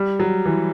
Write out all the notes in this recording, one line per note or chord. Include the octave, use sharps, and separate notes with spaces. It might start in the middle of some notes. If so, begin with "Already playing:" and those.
Already playing: G3
F#3
E3